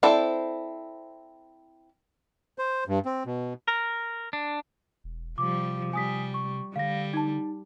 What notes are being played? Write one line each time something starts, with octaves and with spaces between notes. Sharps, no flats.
C4 E4 A4 C5 D5
C5
G2
C4
B2
A#4
D4
E1
C3 F3 G3 D6
G3 G#5 D#6 B6
C#6
D3 G3 F5 A#6
D#4 A5